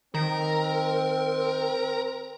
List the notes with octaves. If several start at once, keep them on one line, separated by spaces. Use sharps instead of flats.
D#3 C4 A#4